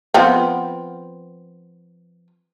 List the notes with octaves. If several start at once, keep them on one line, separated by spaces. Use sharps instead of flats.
F3 B3 C4